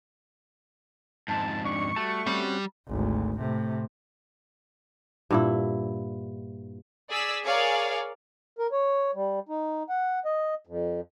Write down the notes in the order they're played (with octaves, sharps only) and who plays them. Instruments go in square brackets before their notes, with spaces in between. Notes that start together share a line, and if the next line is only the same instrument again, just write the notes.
[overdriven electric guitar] F2 G#2 [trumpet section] A5
[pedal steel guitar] D4 [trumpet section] C#6
[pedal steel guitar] G3 F#4 A5 [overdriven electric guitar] A3
[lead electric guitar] G3 [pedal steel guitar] C4 C#4 F#4
[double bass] G#1 D2
A2 C3
[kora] G2 A#2 E4
[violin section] G#4 D5 E6 B6
G#4 A#4 C#5 D5 F5
[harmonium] A#4
C#5
G3
D#4
F#5
D#5
F2